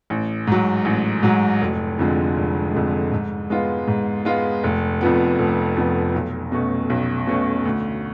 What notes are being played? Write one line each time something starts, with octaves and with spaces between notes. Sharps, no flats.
A1
G#2 F#3
A1
G#2 F#3
F1
F2 D3 F3 G#3
F1
F2 D3 F3 G#3
G#2
G#3 B3 F4
G#2
G#3 B3 F4
F1
F2 F3 B3
F1
F2 F3 B3
B1
B2 A3 C#4
B1
B2 A3 C#4
D2